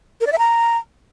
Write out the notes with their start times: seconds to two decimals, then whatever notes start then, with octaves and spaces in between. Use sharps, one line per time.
0.21 A#4
0.26 D5
0.32 E5
0.38 A#5